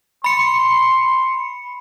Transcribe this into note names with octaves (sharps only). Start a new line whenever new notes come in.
B5 C6 C#7